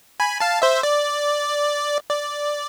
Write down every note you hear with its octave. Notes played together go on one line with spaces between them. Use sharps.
G#5 B5
F5 A5
C5 E5
D5
D5